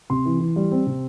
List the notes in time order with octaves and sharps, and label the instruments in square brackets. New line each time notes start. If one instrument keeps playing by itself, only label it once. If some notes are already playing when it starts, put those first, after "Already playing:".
[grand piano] C3 C6
E3
E3
G3
C4
C3